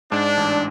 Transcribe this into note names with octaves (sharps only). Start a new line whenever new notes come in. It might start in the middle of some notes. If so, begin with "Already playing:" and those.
G#2 D4
A1